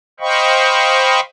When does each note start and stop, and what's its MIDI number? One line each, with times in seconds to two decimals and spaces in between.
0.20 1.20 72
0.20 1.20 75
0.20 1.20 77
0.20 1.20 79
0.20 1.20 83
0.20 1.20 85